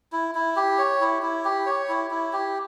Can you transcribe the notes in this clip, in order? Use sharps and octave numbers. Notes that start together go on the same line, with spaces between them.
E4
E4
G4
C#5
E4
E4
G4
C#5
E4
E4
G4